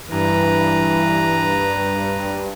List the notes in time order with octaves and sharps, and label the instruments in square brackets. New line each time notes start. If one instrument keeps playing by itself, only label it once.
[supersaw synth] G2 [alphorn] E3 [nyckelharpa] B4 A#5